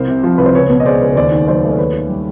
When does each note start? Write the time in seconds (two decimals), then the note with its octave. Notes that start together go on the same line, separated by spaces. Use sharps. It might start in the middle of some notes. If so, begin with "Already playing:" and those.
Already playing: C2 A#4 C5
0.08 C3
0.24 F3
0.38 C2 B4
0.46 C5
0.54 C#2 B4 C#5
0.70 B2
0.80 D#5
0.86 G#3 C5 D5
1.01 C#2
1.16 D#2 C5 D5
1.31 D#3
1.47 F#3 C5 D5
1.64 A3
1.71 D5
1.78 D#2 B4 C#5
1.94 D#3
2.09 G3